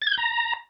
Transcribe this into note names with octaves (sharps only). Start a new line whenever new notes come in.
A6
G#6
G6
A#5